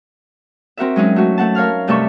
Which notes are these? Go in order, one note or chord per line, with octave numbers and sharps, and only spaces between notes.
C4 F#4 A#4 E5
F#3 G#3 C#4 D#4
A3 F#4
A3 F#5 A5
A#4 C#5 F5 F6
G2 C3 A3 A4 E5 C#6